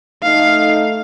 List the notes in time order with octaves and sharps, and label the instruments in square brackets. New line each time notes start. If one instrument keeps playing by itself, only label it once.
[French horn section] A3 D#4 [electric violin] F5